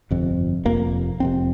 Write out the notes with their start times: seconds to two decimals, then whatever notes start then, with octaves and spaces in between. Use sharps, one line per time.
0.11 G1 F2 C3
0.65 F1 F2 C3 A#3
1.20 F1 F2 C3 C4